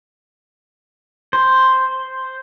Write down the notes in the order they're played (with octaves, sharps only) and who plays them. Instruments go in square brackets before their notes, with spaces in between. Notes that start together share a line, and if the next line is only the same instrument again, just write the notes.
[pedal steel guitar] C5